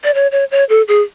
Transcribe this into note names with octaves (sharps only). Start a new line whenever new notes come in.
D5
C#5
C#5
C#5
A4
G#4